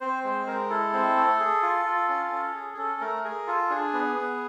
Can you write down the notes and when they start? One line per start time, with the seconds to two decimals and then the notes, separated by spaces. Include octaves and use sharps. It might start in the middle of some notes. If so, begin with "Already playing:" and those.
0.01 C4 C5
0.24 G#3 C5
0.47 G#3 A#4
0.70 E4 A4
0.93 C4
1.16 A3
1.39 G#4
1.62 F4
1.86 F4
2.09 C#4
2.32 C#4
2.55 G#4
2.73 G#4
2.77 C#4 A4
3.01 A3 A#4
3.24 G#4 A#4
3.47 F4 A4
3.70 D4 G#4
3.93 B3
4.16 B3